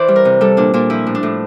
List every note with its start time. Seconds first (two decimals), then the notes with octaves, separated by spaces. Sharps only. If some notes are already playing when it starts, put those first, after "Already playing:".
Already playing: E3 C5 D5
0.08 G3
0.16 A#4
0.25 C3
0.41 G3 A4
0.57 A#2 D4
0.74 A#2 D4
0.90 F3 E4
1.07 A2
1.15 D4
1.23 A2